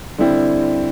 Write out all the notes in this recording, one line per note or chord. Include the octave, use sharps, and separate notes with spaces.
D3 G3 C4 E4